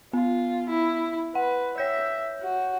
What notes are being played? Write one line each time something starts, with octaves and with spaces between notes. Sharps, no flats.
B3 F4
E4
B4 F#5
C#5 E5 G6
F#4